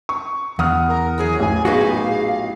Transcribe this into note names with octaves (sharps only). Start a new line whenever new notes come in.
C#6
E2 F#5 D#6 F6
A#4
F#3 C#4 E4 G#4
A1 G#5
F#2 A#2 B3 D#4 F#4 G#4 F5